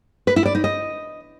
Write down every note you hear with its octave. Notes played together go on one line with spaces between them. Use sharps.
B4
E4
D5
D#4
D#5